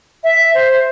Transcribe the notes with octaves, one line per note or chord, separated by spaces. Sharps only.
E5
C5